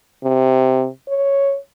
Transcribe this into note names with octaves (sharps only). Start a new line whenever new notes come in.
C3
C#5